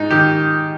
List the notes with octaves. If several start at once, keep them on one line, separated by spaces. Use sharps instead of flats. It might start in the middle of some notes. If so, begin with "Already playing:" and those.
Already playing: G#2 D#4
D#3 G4